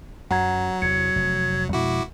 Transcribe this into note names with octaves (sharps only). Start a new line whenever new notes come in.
F#2 F#3 F#5 A#5 G#6
E2 C3 G#6 C#7
F1
F2 B2 G#3 E4 F#4 D6